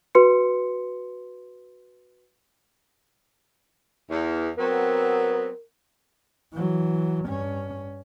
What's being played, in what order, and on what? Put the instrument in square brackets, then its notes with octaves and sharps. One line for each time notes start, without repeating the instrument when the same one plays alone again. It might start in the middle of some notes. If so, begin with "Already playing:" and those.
[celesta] F#4 B4 C6 C#7
[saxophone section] E2
[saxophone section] F#3 B3 C4 [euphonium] A#4
[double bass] E3 F#3
G2 C#4